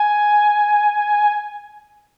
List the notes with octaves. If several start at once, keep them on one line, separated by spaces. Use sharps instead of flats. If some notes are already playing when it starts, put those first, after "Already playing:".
Already playing: G#5